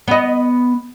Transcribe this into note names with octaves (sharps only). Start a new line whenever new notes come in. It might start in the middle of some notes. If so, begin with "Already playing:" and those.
B3 D#5